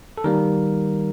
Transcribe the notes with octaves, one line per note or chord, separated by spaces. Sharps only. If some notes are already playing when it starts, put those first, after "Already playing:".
A4
D#3 G3 A#3 A#4